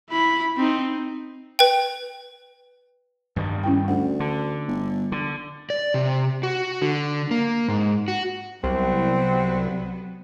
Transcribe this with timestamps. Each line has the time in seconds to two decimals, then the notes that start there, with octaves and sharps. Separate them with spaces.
0.11 E4 B5
0.57 C4 D#4
1.59 B4 G5
3.36 G2 D#3 G3
3.64 C#4 E4 G5
3.88 D2 F#5
4.20 D3
4.68 G1
5.12 D3
5.70 D5
5.94 C3
6.43 F#4
6.82 D3
7.31 A#3
7.68 G#2
8.08 F#4
8.64 C2 F#3 B3 C4